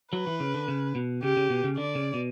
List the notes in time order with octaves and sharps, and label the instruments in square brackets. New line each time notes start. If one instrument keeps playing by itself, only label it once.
[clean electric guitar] F#3 [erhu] B4
[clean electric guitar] E3
C#3
D3
C#3
B2
[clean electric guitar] C#3 [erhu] G4
[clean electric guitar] C#3
B2
C#3
[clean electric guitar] D3 [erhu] D5
[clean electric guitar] C#3
B2